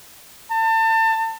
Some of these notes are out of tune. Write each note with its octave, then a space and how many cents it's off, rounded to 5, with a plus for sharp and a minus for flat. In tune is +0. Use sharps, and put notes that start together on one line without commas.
A5 +30